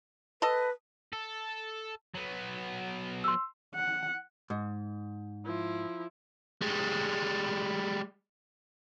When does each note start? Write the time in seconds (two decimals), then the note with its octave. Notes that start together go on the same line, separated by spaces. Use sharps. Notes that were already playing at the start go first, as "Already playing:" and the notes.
0.42 A4 B4 D#5
1.13 A4
2.15 F#3 B3
3.24 C6 E6
3.75 F#5
4.50 G#2
5.45 F3 E4
6.61 G3 G#3